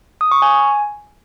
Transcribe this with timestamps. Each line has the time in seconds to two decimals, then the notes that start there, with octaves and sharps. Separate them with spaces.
0.21 D#6
0.31 C#6
0.42 G#5